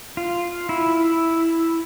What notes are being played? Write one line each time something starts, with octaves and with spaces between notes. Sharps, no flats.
F4
E4